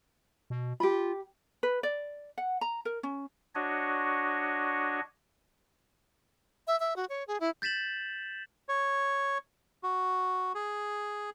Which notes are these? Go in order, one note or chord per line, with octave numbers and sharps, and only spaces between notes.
B2
F4 G4 B5
B4
D5
F#5
A#5
A#4
C#4
D4 F#4 C#5 D#5
E5
E5
F#4
C#5
G#4
E4
G6 A6 B6 E7 F#7
C#5
F#4
G#4